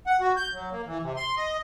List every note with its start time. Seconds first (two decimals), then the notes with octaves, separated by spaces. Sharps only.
0.07 F#5
0.21 F#4
0.37 G6
0.53 F#3
0.71 A#3
0.86 E3
1.02 C3
1.16 C6
1.37 D#5